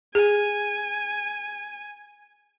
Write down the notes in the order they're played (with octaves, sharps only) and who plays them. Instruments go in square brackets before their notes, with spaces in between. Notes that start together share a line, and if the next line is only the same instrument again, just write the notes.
[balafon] G#4 [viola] G#5